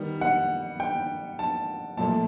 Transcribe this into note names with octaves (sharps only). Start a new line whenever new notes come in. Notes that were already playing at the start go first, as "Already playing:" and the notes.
Already playing: D#3 G3 B3
F#5
G5
A5
B1 A#2 F3 A3 A5